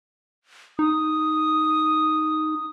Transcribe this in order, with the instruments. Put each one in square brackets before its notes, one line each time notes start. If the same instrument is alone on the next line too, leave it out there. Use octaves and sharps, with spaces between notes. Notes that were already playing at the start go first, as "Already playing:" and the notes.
[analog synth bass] D#4 [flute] D#6